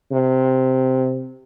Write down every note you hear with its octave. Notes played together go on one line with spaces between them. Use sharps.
C3